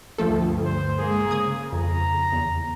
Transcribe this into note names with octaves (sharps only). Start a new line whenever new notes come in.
D2 G2 F3 A3 A4
C5
G#3 A#3 G#4
C#3 D#6 G#6
F2 A#5
E2